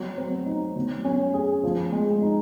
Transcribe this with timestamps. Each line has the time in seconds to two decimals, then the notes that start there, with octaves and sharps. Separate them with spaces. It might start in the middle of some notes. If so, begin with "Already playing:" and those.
Already playing: F#3
0.18 C4
0.46 D#4
0.76 F#3
1.05 C#4
1.34 G#4
1.63 F3
1.92 G#3
2.22 D#4